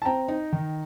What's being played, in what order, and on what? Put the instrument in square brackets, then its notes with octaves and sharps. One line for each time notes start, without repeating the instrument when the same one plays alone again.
[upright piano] A5
[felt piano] C4 [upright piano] G5 A#5
[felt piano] D#4
D#3